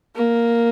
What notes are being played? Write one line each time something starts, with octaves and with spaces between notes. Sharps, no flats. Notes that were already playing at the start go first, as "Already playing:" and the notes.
A#3